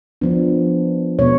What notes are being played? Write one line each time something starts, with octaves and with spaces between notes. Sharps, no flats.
F3 B3 D4
B2 G#3 B3 C#5